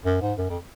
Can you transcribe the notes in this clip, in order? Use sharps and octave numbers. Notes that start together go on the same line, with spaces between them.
F#2
G#2
F#2
F2